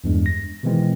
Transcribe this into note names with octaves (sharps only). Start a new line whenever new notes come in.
E2 G2 G#3
A#6
B2 D#3 E3 G#3 C4